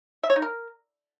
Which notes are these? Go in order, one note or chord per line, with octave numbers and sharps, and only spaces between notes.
E5
C#5
D#4
A#4